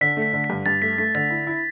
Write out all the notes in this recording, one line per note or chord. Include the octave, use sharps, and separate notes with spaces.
D3 B6
A3
B6
D3
B6
G2
G2 A6
A3 B6
A3 B6
D3 A6
E4
E4